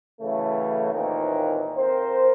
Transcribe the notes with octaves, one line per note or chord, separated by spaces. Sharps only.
C#3 E3 F#3 A3
D#2 A#2 E3 C4 D#4 A#4
F2 C4 A#4 C5